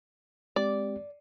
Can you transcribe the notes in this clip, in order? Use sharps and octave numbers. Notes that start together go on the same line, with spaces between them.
G#3 C4 G4 D5